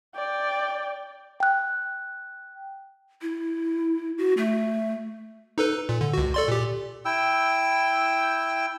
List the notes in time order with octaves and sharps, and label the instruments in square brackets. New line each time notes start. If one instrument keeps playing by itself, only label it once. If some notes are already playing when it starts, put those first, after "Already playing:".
[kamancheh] D5 G5
[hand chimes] G5 F#6
[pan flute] E4
F#4
A3
[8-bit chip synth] D#4 A4 B4
A#2
D3
C#2 F#4
A4 D5 C6
A#2 G4
[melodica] E4 G5 E6